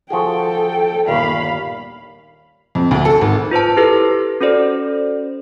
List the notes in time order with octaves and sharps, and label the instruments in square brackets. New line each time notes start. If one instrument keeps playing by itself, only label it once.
[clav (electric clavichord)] F3 F#4 G#4 [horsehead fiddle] A4 G5
[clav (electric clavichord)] G1 D#2 A#2 [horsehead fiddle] F5 B5
[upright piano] F2
D2
A4
G#1
[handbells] F4 B4 C5 A5
E4 G4 A4 B4
C#4 F#4 A4 C5 D5